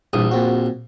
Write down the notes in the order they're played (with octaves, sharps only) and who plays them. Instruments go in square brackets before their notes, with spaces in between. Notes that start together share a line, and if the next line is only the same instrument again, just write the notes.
[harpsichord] A#1 [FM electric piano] G2 E3 D#6
[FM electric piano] A#2 C4 F#4